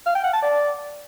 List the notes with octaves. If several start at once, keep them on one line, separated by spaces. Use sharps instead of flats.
F5
G5
F#5
A5
D5